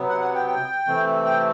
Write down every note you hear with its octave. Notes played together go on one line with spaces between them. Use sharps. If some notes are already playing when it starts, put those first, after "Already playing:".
Already playing: C3 F#3 B3
F#5
F#5
G5
G5
C3 E3 A3 C4
G5